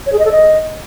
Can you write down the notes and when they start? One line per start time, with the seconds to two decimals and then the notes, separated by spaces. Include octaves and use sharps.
0.06 C#5
0.12 G#4
0.19 D#5
0.25 A4
0.31 D#5